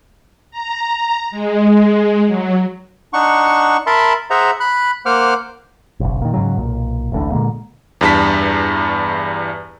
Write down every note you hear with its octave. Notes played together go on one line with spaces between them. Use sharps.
A#5
G#3
F#3
D4 D#4 F#5 C#6
A#4 E5 A5 B5 C6
G#4 C5 E5 F#5 A#5
B5 F#6
A#3 C5 F#5 D6 F6
F#1 B1
A#2 D#3
G#2 C#3 F#3
B1 A#2
D1 A1 A2 D3
A#2 D3 G#3 A#3
E2 G2 A5 B6